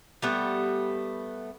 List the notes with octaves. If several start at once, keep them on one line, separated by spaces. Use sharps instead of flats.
G3 A3 B3